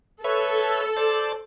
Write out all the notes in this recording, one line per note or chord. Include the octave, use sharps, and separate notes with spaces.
A4 B4 C#5 E5
C5 D5 A5